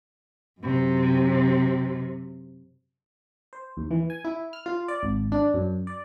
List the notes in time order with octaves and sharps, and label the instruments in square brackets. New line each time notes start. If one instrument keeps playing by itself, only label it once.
[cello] F#2 C3
[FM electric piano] C5
D#2
E3
G#5
E4
F6
F4
D5
G#1
D4
F#2
D5